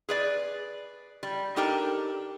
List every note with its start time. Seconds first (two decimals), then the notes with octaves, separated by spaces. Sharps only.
0.09 G#4 B4 D5
1.23 G3
1.56 D4 D#4 G4 A4 A#4